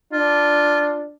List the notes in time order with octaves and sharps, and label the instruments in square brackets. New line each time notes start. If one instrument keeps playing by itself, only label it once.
[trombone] D4 [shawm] F4